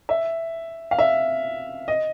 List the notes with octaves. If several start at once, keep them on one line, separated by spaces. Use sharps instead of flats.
E5
F5
E5
D#5